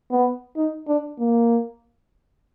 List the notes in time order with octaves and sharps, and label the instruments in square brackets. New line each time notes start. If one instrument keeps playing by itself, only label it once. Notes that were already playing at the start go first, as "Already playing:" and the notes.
[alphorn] B3
D#4
D4
A#3